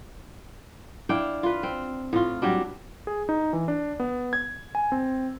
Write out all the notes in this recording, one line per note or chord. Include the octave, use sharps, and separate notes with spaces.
D4 E4 F5 G5
F4 B4
C4
A2 F4
F#3 G3 D4
G#4
D#4
E3
D4
B3
G#6
G#5
C4